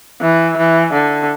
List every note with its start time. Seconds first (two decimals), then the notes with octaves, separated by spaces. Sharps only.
0.21 E3
0.57 E3
0.93 D3